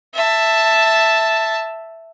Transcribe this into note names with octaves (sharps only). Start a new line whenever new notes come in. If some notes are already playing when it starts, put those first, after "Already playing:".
E5 A5